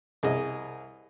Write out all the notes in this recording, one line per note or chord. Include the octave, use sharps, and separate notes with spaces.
C2 G#4 D#5